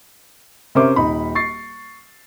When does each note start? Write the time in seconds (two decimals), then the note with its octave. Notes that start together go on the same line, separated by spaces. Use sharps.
0.75 C3 C#4 A#4 C5 E5 D6
0.96 D#1 D#4 B5
1.35 C#6 A6 C7